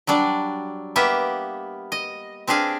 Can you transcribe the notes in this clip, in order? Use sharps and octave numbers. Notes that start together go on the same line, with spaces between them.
F#3 G3 D4 D5
A#3 B3 G4 E5
D#5
C4 D4 G4 G#4 F5